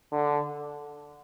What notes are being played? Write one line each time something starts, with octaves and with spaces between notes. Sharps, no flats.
D3